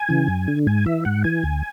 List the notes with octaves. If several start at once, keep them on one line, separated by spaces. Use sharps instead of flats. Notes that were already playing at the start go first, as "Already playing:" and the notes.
Already playing: G#5
C#3 E3
F#2
D3
G#2 G#5
E3 E5
G#2 F#5
E3 G#5
D2